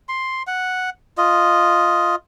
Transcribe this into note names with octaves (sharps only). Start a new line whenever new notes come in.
C6
F#5
F4 D#5